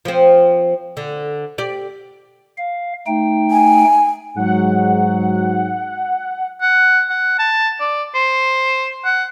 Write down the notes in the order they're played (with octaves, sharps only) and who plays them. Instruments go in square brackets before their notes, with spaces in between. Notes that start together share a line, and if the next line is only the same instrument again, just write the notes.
[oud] F3 C4
D3
G4 D5
[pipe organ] F5
A3 D#4 G5
[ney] G#5
[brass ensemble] G#2 F#3 [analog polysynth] F#5
[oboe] F#5
F#5
A5
D5
C5
F#5